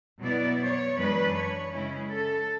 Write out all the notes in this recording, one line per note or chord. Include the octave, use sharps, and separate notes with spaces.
B2 F#3 B3 E4 D5
C#5
F#2 E3 G#3 D4 B4
C#5
C#3 G#3 C#4 E4
A4